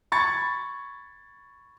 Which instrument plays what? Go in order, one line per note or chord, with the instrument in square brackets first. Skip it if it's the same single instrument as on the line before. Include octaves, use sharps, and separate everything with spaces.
[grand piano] B5 C#6 G#6 A6 C#7